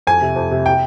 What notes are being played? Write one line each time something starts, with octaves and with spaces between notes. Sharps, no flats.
F2 G#5
C3
F2
C3
G5